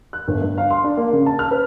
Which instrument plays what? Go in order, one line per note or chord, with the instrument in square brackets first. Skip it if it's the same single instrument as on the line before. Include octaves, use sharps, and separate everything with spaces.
[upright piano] F#6
G1
G2
F5
C6
D4
A#3
C#3
A5
F6
B4